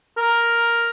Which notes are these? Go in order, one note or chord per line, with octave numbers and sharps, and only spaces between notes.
A#4